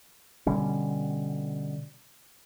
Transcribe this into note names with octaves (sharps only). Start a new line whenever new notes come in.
B2 D3 G3 C#4